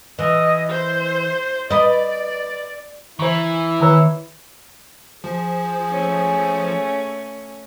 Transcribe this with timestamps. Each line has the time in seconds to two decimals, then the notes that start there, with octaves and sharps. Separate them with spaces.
0.19 E3 D#5
0.70 C5
1.70 B4 D5 D#5
3.19 E3 E4 C5 A#5 C#6
3.80 D#3 B4 C#5 A#5 E6
5.24 F3 G#4
5.91 A3 C#4